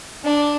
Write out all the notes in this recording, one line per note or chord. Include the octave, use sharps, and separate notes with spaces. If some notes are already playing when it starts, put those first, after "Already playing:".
D4